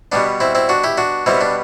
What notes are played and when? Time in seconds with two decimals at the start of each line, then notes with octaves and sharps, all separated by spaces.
0.12 B2 G3 B3 D4
0.40 C4 E4
0.55 C4 E4
0.69 D4 F#4
0.84 E4 G4
0.98 D4 F#4
1.26 B2 G3 B3 C4 E4
1.41 D4